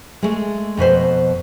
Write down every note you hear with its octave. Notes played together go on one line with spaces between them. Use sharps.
G#3 A3
F2 B2 B4 C5